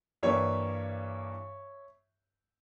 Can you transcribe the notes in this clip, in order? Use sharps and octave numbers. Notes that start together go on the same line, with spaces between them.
G2 E3 G3 A#3 C#5 E5